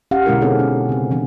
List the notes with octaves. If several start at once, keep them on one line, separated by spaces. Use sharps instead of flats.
C#4 G4 F5 F#5
B2 D3 G#3 C#4 E4 A#4
B3 C4 D#4 G#4 A4 C#5
C#4
C#3 C4
E3 C4 D4